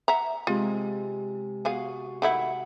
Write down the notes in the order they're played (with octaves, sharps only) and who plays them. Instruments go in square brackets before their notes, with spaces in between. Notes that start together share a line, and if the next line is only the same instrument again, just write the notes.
[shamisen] E5 F#5 A#5
[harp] C3 G#3 [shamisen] F4
[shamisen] B3 G#4 F5 [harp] F#4
[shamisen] D#3 A3 E4 [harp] F#5